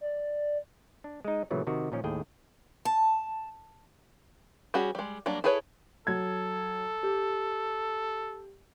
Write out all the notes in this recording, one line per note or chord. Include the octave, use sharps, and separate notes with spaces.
D5
D4
G#3 D#4
A#2 C#3 E3 F#3 A3
C3 D#3 F#4
A#2 D#3 F3 C#4
D#2 A2 G#4 G5
A5
G3 C#4 F#4 G#4
G3 G#3
F#3 G3 A#3 D4
E4 G#4 A4 B4 C#5
F#3 A4 G#6
G4